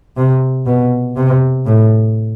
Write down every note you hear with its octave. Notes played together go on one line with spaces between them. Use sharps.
C3
B2
C3
A2